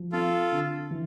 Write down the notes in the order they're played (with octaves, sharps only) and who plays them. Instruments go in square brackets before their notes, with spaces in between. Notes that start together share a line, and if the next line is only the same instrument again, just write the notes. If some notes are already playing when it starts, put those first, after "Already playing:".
Already playing: [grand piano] F3
[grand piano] C4 [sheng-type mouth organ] F4 A4
[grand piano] D3
E3